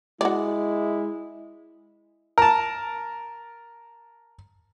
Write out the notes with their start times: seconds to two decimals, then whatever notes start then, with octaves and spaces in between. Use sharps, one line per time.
0.21 G#3 E4 F#4 D5
2.38 A#4 A5